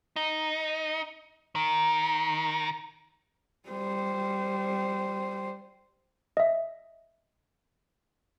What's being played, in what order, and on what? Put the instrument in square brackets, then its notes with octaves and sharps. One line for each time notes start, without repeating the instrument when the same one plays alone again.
[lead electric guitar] D#4
D#3
[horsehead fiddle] G3 C5
[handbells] D#5 E5